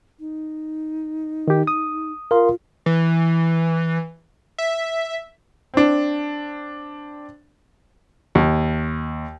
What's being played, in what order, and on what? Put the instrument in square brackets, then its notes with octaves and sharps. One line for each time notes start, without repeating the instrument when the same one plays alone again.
[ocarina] D#4
[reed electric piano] D#3 G4
D#6
[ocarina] F4 [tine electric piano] A#4 F5 C6
[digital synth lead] E3
E5
[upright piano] C4 D4
[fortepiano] D#2